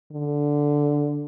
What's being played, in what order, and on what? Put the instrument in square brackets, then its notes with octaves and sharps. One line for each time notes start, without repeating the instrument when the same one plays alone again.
[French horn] D3